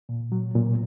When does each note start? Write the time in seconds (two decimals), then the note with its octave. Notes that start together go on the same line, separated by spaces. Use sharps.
0.09 A#2
0.32 F#3
0.55 A#2